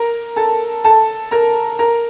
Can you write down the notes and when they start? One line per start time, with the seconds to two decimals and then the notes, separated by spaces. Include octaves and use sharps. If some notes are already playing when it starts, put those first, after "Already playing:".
Already playing: A#4 A#5
0.36 A4 A5
0.84 A4 A5
1.31 A#4 A#5
1.79 A#4 A#5